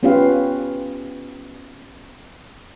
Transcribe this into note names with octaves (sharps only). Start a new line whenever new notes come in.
B3 C#4 F4 G4 B4 F5